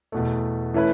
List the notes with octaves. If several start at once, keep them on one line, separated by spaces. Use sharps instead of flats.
E2 B2 A3
E3 A3 C#4 E4 B4